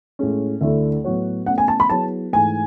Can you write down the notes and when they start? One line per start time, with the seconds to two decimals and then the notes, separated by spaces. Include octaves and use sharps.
0.19 A2 G#3 C#4
0.61 D2 D3 A3 E4 A4 E5
1.04 A2 F#3 B3 F#4 C#5
1.46 B2 A3 C#4 F#5
1.58 G#5
1.68 A5
1.80 B5
1.90 F#3 B3 E4 G#4 C#5 A5
2.33 G#2 E3 A3 G#5